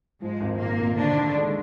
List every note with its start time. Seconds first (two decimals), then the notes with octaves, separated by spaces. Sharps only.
0.21 G#2 F3 G#3
0.41 G#1
0.60 G#1 A#2 A#3
0.79 G#1
0.97 D3 D#3 D4
1.17 D#3
1.35 G#3